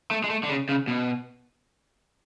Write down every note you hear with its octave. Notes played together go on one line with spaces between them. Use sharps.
A3
G#3
A3
D3
C#3
C#3
B2